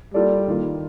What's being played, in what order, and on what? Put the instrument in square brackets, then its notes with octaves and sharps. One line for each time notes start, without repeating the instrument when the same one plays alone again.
[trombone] G3 [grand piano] A#3 F4 A4 D5
[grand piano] D#3 A#3 F4